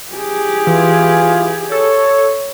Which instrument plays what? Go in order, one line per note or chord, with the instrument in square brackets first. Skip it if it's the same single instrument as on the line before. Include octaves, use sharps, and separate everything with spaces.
[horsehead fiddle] G4 G#4
[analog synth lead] E3 [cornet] F4
[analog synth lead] A4 [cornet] C#5